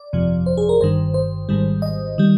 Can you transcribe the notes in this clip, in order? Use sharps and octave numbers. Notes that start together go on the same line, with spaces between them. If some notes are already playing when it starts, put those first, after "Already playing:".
Already playing: D5
G1 F2 C3 F3
C5
G#4
A#4
G1 G2 D#3 C5
C5
G#1 G#2 D#3 G3
D#5
D#3 G3